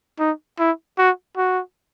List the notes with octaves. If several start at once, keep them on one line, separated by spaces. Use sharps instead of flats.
D#4
E4
F#4
F#4